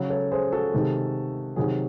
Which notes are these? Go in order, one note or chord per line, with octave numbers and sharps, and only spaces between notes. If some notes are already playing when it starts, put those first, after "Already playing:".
Already playing: C#3 F#3
A4 C#5
G#4 C5
F#4 A4
C3 D#3 G#3
C3 D#3 F#3 G#4